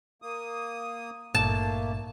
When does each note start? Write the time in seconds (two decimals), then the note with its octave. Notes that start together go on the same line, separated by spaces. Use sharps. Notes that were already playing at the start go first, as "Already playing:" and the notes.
0.22 A#3 D#6
1.35 G#1 G2 A#2 A3 A#3 A5